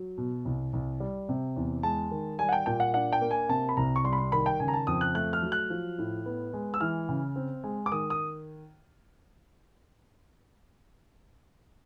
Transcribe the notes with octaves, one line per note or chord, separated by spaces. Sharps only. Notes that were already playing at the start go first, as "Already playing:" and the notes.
Already playing: F#3
B2
C2
C2
G3
C3
E2
G#3 A5
D#3
G3 G#5
F#5
G5
A#2 G5
F#5
D4 F#5
G5
A#3
G#5
C3 A5
B5
C2 A#5
C#6
G3 C6
B5
C6
D#3 B5
G5
C#3 G#5
A#5
A5
F2 D#6
F#6
A3 F#6
F6
F#3
F#6
F3
A2
B3
G#3
E6
E3 F6
C#3
C4
G#3
D6
D#3 D#6
D#6